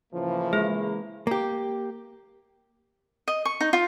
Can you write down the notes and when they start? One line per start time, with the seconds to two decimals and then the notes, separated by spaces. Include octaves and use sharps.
0.13 A2 C#3 E3 F3 A#3
0.53 G#3 G#4
1.27 A#3 G4
3.28 D#5
3.45 C#6
3.61 D#4
3.73 F4